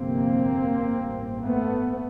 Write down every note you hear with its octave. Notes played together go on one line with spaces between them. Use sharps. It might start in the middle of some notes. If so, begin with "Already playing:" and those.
Already playing: G1 F2 C3 A#3 C4
A1 G2
A3 B3